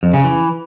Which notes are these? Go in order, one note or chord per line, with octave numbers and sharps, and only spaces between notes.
F2
C#3
E3